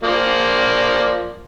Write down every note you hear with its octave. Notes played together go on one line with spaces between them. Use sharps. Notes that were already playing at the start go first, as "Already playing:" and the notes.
F3 A#3 D5